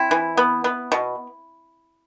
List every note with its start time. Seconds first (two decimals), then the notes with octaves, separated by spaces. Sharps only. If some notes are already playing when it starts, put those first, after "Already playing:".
Already playing: C4 E4
0.11 E3
0.37 B3
0.64 B3
0.92 B2